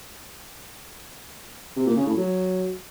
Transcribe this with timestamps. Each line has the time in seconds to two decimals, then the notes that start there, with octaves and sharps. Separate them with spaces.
1.77 C3
1.87 A#2
1.97 C#3
2.07 A2
2.17 F#3